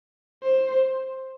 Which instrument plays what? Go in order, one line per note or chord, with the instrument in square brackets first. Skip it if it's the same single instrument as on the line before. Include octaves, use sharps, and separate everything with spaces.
[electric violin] C5